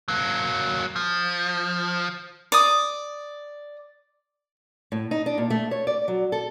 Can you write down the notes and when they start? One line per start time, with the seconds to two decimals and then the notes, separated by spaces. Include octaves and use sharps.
0.08 F#3 A#3
0.96 F3
2.52 D5 D#6
4.92 A2
5.11 D#4
5.26 D4
5.38 A#2
5.50 A3
5.71 C#5
5.87 D5
6.08 F#3
6.32 A4